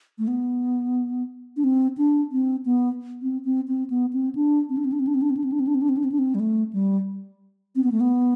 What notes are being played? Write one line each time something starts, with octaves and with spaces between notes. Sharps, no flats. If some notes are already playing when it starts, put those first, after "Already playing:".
A3
B3
D4
C4
D4
C4
B3
C4
C4
C4
B3
C4
D4
C4
D4
C4
D4
C4
D4
C4
D4
C4
D4
C4
D4
C4
D4
C4
D4
C4
D4
C4
D4
C4
G3
A3
G3
C4
B3
A3
B3